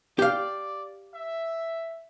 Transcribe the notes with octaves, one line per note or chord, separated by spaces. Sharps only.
G4 D5 F5
E5